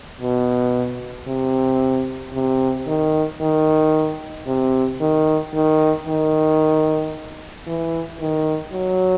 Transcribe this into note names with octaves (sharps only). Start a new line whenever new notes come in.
B2
C3
C3
D#3
D#3
C3
D#3
D#3
D#3
E3
D#3
F#3